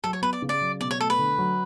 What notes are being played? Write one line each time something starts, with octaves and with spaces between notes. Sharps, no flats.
F#3 A4
C#5
B3 B4
D5
C#3
D5
F#3
B2 D5
C#5
A3 A4
B4
D3
F#3